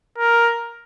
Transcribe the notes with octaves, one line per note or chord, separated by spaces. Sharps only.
A#4